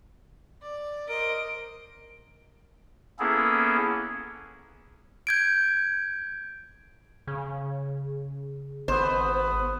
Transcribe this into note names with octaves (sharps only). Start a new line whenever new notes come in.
D5
A#4 C5 D#5 D7
A#3 B3 C#4 E4 G#4 A4
G6 G#6 D7
C#3
G#1 B3 C5